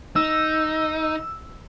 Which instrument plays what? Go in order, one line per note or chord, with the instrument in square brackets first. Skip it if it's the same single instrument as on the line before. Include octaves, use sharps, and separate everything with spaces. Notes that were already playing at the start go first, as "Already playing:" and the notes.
[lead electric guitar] D#4 [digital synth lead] E6